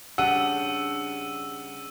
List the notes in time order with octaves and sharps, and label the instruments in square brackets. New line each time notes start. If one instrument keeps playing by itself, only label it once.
[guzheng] C#3 G3 D4 [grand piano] F#5 [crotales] E6 D#7